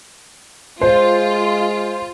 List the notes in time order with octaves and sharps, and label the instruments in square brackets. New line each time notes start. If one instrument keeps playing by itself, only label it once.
[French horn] G#3 [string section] F4 [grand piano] C5